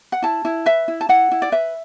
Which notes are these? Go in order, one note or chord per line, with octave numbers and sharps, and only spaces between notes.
F#5
E4 A5
E4
B4 E5
E4
A5
E4 F#5
E4
D5
B4 E5